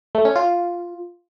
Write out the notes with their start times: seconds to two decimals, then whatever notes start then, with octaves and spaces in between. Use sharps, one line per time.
0.15 A3
0.25 C#4
0.36 F4